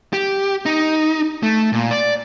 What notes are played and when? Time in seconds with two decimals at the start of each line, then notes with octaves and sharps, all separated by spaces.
0.13 G4
0.66 D#4
1.43 A3
1.72 A#2
1.91 D5